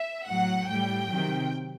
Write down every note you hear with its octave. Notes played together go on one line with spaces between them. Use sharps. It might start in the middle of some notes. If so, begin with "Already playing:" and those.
Already playing: E5
A2 F#3 F#5
A2 G3 G5
C3 D#3 F#3